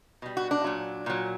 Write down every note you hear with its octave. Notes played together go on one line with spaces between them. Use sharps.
B2 G3
F#4
D4
A#2 F#3
A#2 F#3